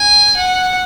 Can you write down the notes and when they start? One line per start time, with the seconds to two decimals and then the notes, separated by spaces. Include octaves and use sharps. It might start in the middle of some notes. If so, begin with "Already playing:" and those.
Already playing: G#5
0.37 F#5